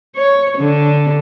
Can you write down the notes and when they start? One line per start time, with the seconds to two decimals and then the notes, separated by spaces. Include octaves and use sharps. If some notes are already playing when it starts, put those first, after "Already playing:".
0.16 C#5
0.58 D3